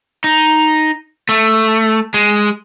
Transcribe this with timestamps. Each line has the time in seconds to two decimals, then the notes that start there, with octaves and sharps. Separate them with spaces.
0.24 D#4
1.29 A3
2.14 G#3